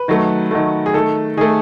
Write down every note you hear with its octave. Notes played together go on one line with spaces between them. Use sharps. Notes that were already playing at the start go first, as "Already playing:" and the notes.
Already playing: B4
D#3 F#3 A3
D#3 F#3 A3
G#4
D#3 A3 A4
D#3 A3 G#4